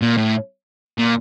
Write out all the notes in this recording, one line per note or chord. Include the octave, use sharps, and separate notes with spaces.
A#2
A2
A#2